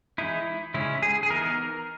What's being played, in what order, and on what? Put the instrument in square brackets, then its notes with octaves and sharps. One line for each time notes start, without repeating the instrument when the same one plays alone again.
[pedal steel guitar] E3 G#3 D#4 E4
C#3 G#3 C#4 E4
G#4
G#4
E3 B3 D#4 A#4